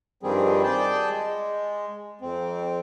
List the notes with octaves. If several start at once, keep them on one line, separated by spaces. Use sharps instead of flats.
G2 D#3 F3 G3 C4 G#4
G#4 D5 G5 A5
G#3
F2 C4